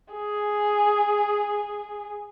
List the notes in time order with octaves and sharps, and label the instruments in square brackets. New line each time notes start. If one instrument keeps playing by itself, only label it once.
[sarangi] G#4